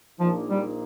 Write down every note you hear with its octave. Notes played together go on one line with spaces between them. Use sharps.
A#1 A#2 F3 A#3 D#4
G3